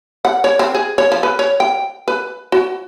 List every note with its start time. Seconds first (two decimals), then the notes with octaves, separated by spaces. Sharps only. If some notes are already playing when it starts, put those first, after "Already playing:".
0.25 F#5
0.44 C#5
0.59 C4
0.75 G#4
0.98 C#5
1.12 F3
1.23 B4
1.39 C#5
1.60 G5
2.08 B4
2.52 F#4